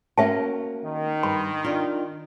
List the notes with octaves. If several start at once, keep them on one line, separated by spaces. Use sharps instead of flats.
A#3 C#4 F#4 E5 A5
D#3
G2 B5
D4 F4